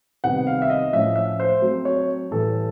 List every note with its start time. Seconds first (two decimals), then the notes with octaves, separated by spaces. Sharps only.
0.24 C3 D#3 G3 B3 F#5
0.47 F5
0.62 E5
0.70 D#5
0.93 A2 F3 A3 C#4 E5
1.16 E5
1.40 C5
1.62 F#3 A3 C4
1.85 C#5
2.31 A2 E3 G3 A4